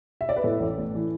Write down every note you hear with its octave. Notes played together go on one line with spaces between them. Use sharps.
E5
D5
B4
A2 A4
A1
A3
E3